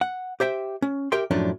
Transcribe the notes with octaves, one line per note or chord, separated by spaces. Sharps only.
F#5
G4 C5 E5 G5
C#4
G4 A#4 E5 G5 C6
F#2 A2 F3 C#4 D4